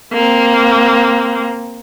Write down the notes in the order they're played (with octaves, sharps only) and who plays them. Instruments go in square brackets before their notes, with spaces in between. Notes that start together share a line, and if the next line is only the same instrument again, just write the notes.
[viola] A#3 C4